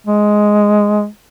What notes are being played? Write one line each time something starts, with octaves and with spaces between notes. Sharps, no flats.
G#3